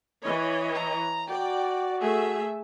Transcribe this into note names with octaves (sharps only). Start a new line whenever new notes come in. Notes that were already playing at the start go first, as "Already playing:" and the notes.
E3 C#5 D#5
A#5
F#4 D5 G5
A3 G#4 E5